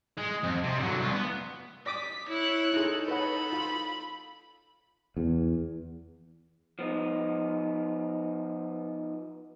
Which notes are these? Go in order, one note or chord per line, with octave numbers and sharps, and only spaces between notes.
G#3
F2
C3
D3 F#3
C2 F4
B3
D5 D6 D#6 B6
E4 C#5 F#6
D#4 E4 G#4 A4
B4 C#5 F#5 B5
F4
E2
F3 B3 D#4